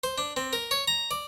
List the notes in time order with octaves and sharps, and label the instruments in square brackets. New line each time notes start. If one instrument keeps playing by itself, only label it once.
[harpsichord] C5
D4
C4
A#4
C#5
A#5
D5